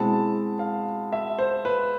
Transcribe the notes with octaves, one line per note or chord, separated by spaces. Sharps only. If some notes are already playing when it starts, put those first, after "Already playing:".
Already playing: B2 G#3 C4 E4 A5
F5
E5
C5
B4